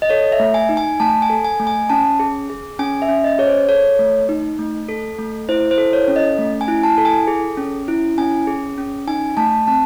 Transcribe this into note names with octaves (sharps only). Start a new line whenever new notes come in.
D#5
A4 C#5
E5
A3
G#5
D#4
G#5
A3 A5
G#5
A4
G#5
A3
G#5
C#4 A5
G#4
G#4
C#4 G#5
E5
C#4
D#5
G#4 C#5
C5
A4 C#5
A3
D#4
A3
A4
A3
E4 C5
C5
A4
C#5
C#4
D#5
A3
G#5
E4
A5
A4
G#5
G#4
C#4
E4
C#4 G#5
G#4
C#4
D#4 G#5
A3 A5
C4 A5